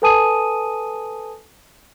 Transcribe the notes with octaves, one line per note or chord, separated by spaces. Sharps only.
A4 B4 G#5 A5 D#6 D#7